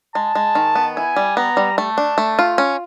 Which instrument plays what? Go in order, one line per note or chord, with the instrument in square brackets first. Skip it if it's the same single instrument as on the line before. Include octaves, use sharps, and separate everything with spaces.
[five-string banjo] G#3 [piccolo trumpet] A5
[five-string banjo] G#3
D#3
B3
[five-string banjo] E4 [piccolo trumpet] G#5
[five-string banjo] G3
[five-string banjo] B3 [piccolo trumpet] A#5
[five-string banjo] G3
[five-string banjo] A3 [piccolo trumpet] A5
[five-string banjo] D4
A3
F4
C#4